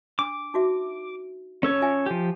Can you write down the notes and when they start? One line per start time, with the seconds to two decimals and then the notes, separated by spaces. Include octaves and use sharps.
0.19 D4 D6
0.54 D#4 F#4 E5
1.63 C#4 A4 C#5
1.82 F4 E5 G#5
2.06 F3 G4